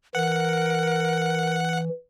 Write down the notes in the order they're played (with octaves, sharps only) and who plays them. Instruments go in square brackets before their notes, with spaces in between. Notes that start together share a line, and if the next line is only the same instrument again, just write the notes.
[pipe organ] E3 [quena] A#4 [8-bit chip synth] F#5